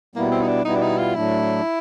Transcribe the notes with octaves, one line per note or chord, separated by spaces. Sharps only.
B2 G3 A#3 B3 E4
C4
D#4
D4
B2 G3 B3 D#4 E4
D4
D#4
F4
A2 F#3 A3 D4 E4